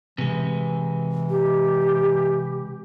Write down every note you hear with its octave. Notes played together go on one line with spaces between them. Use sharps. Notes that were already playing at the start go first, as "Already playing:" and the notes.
C3 E3 G#3
G4